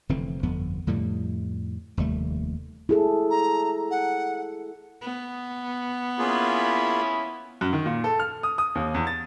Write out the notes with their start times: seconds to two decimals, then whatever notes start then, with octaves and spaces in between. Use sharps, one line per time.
0.09 F1 D3 E3 C4
0.43 G1 F2 B3
0.87 F2 A2 D3 G3
1.97 F1 D#2 G3 A3
2.89 E4 G#4 A4
3.30 A#5
3.91 F#5
5.02 B3
6.18 A#3 C#4 E4 F4 G#4 B5
7.61 F#2
7.73 D#3
7.86 A#2
8.04 A4
8.19 F6
8.43 D#6
8.58 D#6
8.75 D#2
8.94 E2
9.07 A6